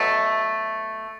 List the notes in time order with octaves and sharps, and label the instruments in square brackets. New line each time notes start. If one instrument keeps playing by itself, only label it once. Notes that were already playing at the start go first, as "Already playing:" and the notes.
Already playing: [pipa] B2 F#3 A3